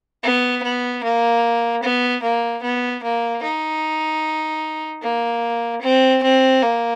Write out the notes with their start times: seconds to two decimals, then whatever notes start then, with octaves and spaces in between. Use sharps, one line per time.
0.23 B3
0.63 B3
1.03 A#3
1.83 B3
2.23 A#3
2.63 B3
3.03 A#3
3.43 D#4
5.02 A#3
5.82 C4
6.23 C4
6.62 A#3